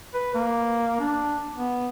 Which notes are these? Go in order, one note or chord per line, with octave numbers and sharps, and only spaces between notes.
B4
A#3
D4
B3